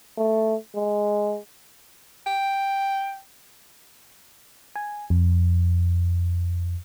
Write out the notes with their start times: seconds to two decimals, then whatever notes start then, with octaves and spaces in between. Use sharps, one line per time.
0.18 A3
0.75 G#3
2.27 G5
4.76 G#5
5.10 F2